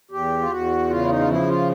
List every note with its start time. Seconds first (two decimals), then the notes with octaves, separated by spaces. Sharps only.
0.11 E2 G4
0.41 F4
0.51 E2 F#4
0.89 C#3 F4
1.02 E4
1.09 D#4
1.19 F4
1.28 F3 E4
1.48 F4